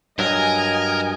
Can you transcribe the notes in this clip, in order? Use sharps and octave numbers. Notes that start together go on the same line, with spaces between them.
G2 F#3 A#4 D#5 G#5